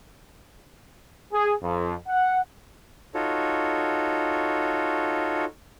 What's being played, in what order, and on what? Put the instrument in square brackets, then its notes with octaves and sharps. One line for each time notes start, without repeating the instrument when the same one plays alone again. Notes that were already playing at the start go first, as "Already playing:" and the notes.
[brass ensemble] G#4
F2
F#5
[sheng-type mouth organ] D#4 F4 F#4 A4 C#5